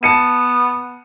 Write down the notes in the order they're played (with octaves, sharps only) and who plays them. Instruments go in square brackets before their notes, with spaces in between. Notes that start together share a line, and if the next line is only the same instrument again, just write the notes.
[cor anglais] B3 [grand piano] A5 C#7 D#7